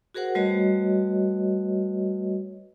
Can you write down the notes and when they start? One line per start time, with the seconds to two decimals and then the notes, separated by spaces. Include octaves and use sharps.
0.14 F#4 G#4 A#4 C5 F#5
0.35 G3 A3 F#4 B4 C#5 D#5